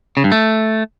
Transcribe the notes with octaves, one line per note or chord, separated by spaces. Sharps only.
C#3
G2
A3